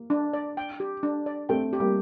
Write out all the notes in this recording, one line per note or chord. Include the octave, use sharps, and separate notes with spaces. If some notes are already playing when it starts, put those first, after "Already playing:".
Already playing: A#3
D4
D5
G5
G4
D4
D5
A3 C4 G5
G4
G3 A#3